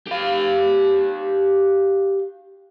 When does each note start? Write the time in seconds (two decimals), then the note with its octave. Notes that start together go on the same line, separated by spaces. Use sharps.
0.07 G4 F5